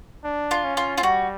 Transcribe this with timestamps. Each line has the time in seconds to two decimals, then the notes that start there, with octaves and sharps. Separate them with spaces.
0.24 D4
0.51 F4
0.64 C#4
0.77 F4
0.97 F4
1.03 G3 F#4